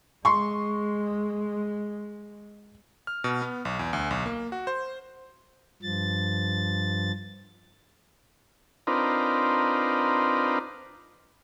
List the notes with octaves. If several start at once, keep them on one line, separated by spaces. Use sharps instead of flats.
G#3 C6 C#6
F6
B2
B3
B1
E2
D2
B1
A#3
F#4
C5
G2 F3 A6
C4 D4 D#4 F4 A#4 B4